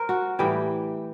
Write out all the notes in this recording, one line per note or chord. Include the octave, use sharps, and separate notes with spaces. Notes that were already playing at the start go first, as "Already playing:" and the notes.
Already playing: A#4 C5
F#4
A2 E3 G3 G4